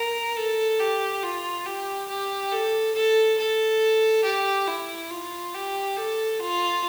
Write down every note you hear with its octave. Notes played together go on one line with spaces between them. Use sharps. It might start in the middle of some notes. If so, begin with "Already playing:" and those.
Already playing: A#4
A4
G4
F4
G4
G4
A4
A4
A4
G4
E4
F4
G4
A4
F4